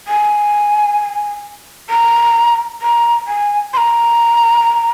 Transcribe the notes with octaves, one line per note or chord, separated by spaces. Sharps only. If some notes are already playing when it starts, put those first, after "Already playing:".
G#5
A#5
A#5
G#5
C6
A#5